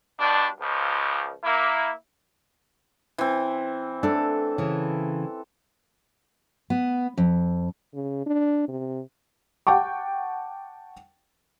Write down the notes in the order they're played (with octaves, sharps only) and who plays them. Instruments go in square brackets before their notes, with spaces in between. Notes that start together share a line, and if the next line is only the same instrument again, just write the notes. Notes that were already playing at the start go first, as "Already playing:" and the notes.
[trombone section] G2 B2 D4
C#2 F3
A#3 E4
[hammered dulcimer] E3 C4
[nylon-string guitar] A3 D4 [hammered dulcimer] A4
[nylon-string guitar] C#3 E3
[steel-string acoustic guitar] B3
F2
[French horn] C#3
D4
C3
[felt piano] F#5 G5 A5 C#6 D6